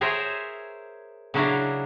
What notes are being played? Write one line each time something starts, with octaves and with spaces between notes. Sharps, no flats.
G#4 A#4 C5 C#5 E5 G#5
C#3 F#3 C#4 D4 E4 A#5